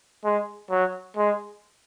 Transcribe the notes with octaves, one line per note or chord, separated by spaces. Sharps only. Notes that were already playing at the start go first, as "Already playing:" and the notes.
G#3
F#3
G#3